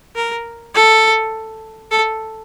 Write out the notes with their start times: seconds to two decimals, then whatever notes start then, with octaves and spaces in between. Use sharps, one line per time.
0.16 A#4
0.74 A4
1.91 A4